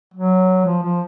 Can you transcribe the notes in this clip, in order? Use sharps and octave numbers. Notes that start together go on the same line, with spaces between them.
F#3
F3
F3